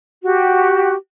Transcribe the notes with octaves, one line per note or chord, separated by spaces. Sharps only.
F#4 G4